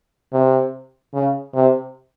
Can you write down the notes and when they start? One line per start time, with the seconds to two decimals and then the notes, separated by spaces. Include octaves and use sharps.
0.33 C3
1.13 C#3
1.55 C3